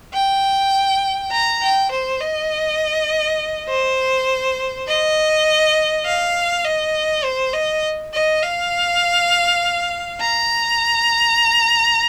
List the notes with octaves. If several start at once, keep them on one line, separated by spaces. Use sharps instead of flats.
G5
A#5
G5
C5
D#5
C5
D#5
F5
D#5
C5
D#5
D#5
F5
A#5